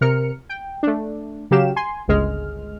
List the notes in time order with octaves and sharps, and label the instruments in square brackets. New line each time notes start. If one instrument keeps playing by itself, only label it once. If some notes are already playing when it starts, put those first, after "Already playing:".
[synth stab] C3 A#4 F6 C#7
G5
A3 D4
C#3 F#3 G4 F5 E7
G#5 C6
G1 C#2 G#3 F6